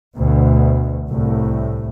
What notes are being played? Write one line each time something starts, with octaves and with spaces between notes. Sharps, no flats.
D2 B2
C2 A2